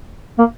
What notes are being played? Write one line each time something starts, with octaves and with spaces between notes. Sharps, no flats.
A#3